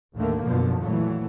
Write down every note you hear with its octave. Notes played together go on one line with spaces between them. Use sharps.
A1 D#2 A2 D3 A3 A#3
F#2 B2 D3 F3
F2 A#2 E3 F#3 A3